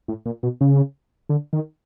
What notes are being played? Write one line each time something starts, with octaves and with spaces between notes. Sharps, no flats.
A2
A#2
B2
C#3
D3
D#3